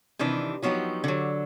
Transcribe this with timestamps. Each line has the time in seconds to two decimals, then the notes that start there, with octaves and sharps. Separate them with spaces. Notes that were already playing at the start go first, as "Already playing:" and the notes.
0.19 C3 D#3 E3 D4
0.62 F3 F#3 B3 D#4 G4
1.04 D3 F#3